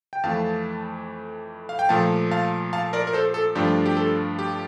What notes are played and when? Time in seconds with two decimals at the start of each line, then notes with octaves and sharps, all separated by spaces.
0.13 G5
0.23 F2 E3 A3 F5 A5
1.69 F5
1.79 G5
1.89 A#2 F3 A3 F5 A5
2.31 F5 A5
2.73 F5 A5
2.93 A#4 D5
3.07 A#4
3.13 A4 C5
3.34 A4
3.55 G2 F3 A3 D4 F4 G4
3.86 G4
3.97 A4
4.39 G4